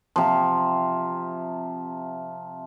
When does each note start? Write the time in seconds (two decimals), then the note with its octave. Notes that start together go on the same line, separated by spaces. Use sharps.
0.16 C3 F3